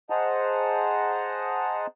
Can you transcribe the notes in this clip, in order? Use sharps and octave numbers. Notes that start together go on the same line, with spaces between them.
G#4 C5 D#5 F#5 A5 A#5